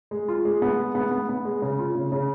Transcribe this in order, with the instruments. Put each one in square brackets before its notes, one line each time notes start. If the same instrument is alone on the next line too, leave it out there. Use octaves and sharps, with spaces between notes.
[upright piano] G#3
F4
G#3
B3
G#3
B3
B3
B3
G#3
C#3
F4
C#3
C#3